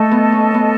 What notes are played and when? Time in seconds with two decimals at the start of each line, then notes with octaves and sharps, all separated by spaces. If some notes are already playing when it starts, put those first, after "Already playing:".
Already playing: A3 A4 D#5 A5
0.11 B3
0.32 C#4
0.54 B3